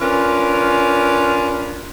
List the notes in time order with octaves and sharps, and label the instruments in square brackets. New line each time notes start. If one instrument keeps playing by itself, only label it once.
[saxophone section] C#4 D4 F4 A#4 B4